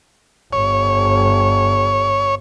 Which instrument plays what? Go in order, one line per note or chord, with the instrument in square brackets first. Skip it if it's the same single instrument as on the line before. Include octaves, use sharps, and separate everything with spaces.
[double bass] G1 [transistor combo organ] C#5